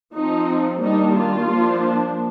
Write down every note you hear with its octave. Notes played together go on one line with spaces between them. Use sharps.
F3 C4 D#4
D#3 G3 A#3 D4 D#4
F4
F3 A#3 D4